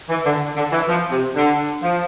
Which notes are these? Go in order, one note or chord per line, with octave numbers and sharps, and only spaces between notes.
E3
D3
D3
E3
F3
C3
D3
F3